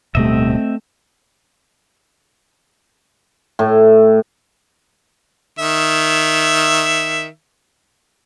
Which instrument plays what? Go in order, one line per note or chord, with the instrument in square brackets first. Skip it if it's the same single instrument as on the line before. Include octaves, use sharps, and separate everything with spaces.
[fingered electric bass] D1 B2 G3 [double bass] A3 [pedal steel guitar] C4 D#5 E5
[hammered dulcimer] A2
[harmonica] D#3 E5